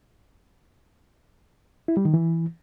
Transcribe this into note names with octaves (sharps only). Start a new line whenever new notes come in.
E4
G3
D#3
E3